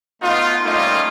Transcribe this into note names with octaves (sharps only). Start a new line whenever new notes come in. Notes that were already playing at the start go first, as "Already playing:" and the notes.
A3 B3 D#4 F4
G3 A3 A#3 C#4 D#4 F4